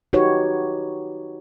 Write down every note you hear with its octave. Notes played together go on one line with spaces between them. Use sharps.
D#4 F#4 G4 B4 C#5